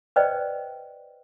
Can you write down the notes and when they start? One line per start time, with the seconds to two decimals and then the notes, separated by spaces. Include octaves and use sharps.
0.16 B4 C5 D5 D#5 G5